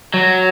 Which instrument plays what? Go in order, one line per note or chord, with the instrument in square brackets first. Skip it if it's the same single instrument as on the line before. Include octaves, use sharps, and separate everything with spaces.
[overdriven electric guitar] F#3